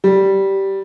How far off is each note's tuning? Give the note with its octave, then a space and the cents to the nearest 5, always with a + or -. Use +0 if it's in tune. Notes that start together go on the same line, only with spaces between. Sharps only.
G3 -10